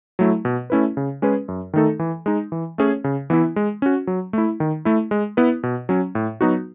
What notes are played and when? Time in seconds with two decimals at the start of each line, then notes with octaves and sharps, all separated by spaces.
0.19 F#3 A3 E4
0.45 B2
0.70 A3 C#4 E4 B4
0.97 C#3
1.22 G#3 C#4 G#4 B4
1.48 F#2
1.74 D#3 A3 D#4 A4
1.99 E3
2.26 G#3 D#4
2.52 E3
2.78 A3 C#4 G#4 C#5
3.04 C#3
3.30 E3 B3 E4
3.56 G#3
3.82 C#4 F#4
4.07 F#3
4.33 A3 E4
4.60 D#3
4.85 A3 E4
5.11 G#3
5.37 B3 E4 B4
5.63 B2
5.89 F#3 C#4
6.15 A2
6.41 F#3 B3 D#4 F#4